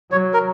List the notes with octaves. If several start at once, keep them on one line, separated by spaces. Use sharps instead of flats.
F#3 C#5
A#4